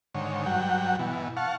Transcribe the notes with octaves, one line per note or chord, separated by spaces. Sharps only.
G#2 D3 D#3 C#5
G2 F#3 F#5 G5
B2 E3
F5 F#5 A5 C#6